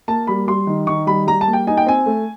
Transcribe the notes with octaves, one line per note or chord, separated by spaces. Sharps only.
A#3 A5
G3 B5
G3 C6
D#3
D#3 C#6
G3 B5
G3 A#5
A5
A#3
G5
D#4 G#5
G5
C4 G#5
A3